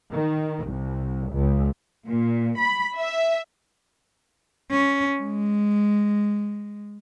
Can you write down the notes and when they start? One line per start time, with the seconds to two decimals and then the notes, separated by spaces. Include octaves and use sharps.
0.11 D#3
0.64 C2
1.31 C#2
2.08 A#2
2.60 B5
2.98 E5
4.71 C#4
5.19 G#3